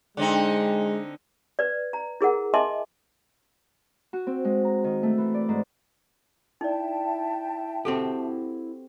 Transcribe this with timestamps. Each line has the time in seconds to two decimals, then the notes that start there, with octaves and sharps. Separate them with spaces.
0.17 D3 G#3 C4 D#4
1.59 B4 D5
1.93 A#5
2.21 E4 G#4 A#4 F#5
2.54 D#5 E5 G#5 A5 C6 D6
4.13 F#4
4.27 C4
4.45 G#3
4.65 A#5
4.84 D#3
5.03 A3
5.18 E3
5.34 D5
5.49 G#2
6.61 D#4 E4 D5 E5 G5 A5
7.85 C4 F#4 G4 A4